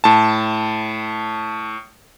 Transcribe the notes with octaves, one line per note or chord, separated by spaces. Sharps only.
A2 A5